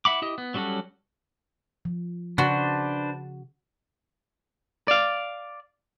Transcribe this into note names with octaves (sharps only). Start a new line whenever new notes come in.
E4 E5 F#5 B5 D6
E4 G4 D#5
B3
F#3 G3 C#4 F#4 A4
F3
C#3 D4 F#4 B4 C5
D5 F5